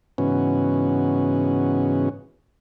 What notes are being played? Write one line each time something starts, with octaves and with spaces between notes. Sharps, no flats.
G#2 C#3 E3 B3 C#4 F#4